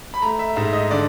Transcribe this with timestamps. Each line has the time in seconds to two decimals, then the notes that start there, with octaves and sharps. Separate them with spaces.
0.14 B5
0.22 A3 A#5
0.39 E5
0.56 G#2 E5
0.73 D#5
0.91 D3 D5